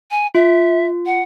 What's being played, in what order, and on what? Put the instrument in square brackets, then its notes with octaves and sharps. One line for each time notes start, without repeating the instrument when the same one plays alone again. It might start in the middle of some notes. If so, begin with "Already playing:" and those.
[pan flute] G#5
[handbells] F4 [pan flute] E5
[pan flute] F#5